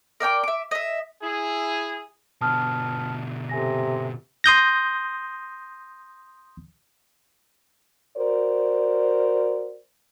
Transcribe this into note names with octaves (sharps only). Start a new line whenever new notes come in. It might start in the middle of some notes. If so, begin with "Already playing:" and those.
A#4 D5 G5 D6
E5 D6
D#5 E5
E4 G#4
B2 D3 A5 D#6 F6
C3 A4 G#5 A#6
C6 D#6 G6 A#6
F#4 A#4 C5 D5